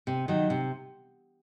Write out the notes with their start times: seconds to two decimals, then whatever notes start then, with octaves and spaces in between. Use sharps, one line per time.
0.07 C3
0.28 D#3 F#3
0.50 C3